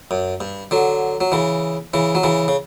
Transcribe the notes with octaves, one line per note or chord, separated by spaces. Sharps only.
F#2
G2
D3 F#3
F#3
C#3 E3
C#3 E3
F#3
C#3 E3
C#3